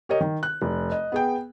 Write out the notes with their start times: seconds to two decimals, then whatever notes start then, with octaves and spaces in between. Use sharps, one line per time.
0.09 G4 A#4 C#5 D#5
0.21 D#3
0.43 F#6
0.62 F1
0.92 D#5
1.12 B3 G#4 G5